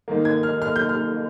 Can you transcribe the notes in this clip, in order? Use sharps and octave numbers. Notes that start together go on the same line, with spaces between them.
G#2 D#3 A#3
G#6
F6
F6
G6
F6